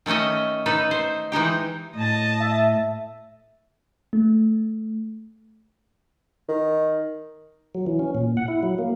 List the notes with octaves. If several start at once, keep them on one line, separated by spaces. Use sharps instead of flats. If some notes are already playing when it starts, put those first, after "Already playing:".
D#3 A3 C#4 A4 D#5
D#4 A4 B4
C5
E3 G#3 D#4 G4
A2 D#5 A5
E5
A3
D#3
F#3
E3
C#4
A#2
F#5
E4
F#3
A#3